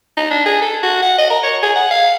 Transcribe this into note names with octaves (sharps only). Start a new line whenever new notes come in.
D#4
D4
G#4
A4
F#4
F#5
D#5
A#4
C#5
G#4
F#5
F5